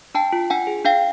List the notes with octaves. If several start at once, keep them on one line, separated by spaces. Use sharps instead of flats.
D4 G5 A5
F4
D4 F#5 G#5
G#4
D4 F5 G5